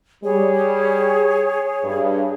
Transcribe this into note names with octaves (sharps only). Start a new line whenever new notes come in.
G3 G#4 C#5
G2